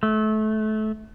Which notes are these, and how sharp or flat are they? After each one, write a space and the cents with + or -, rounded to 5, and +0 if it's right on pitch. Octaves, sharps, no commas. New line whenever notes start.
A3 -25